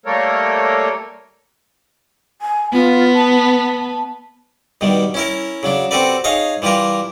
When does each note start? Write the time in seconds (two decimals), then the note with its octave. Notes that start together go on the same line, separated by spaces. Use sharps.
0.06 G3 A3 A#3 A4 A#4 C#5
2.42 G#5
2.73 B3 F4
3.14 A5
4.81 G2 B2 D#3 G3
5.14 C#4 E4 A#4
5.63 C#3 F#3 D4
5.91 C4 F#4 G4 A4 B4 D5
6.24 D#4 G#4 C#5 D#5 F5
6.62 E3 G3 F4 G4 A#4